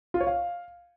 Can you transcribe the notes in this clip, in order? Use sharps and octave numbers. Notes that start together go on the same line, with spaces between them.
F4
C#5
F5